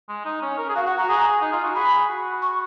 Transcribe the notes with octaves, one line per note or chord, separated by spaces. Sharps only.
G#3
D#4
C#4
A#4
G#4
F#4 F5
F#4 F#5
F#4 A#5
G#4
D#4
F4
F#4
G#4 B5
F#4
C#6